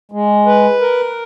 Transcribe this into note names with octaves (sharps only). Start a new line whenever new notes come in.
G#3
B4
A#4